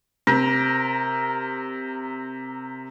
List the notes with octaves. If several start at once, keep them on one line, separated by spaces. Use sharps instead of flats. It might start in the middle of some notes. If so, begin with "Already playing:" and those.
C3 A#4